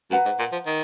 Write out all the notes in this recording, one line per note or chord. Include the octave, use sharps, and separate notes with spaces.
F#2 B4 F#5 A#5
G#2
A#2
F3
D#3